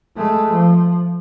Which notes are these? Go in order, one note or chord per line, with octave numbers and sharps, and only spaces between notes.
G#3 A3
F3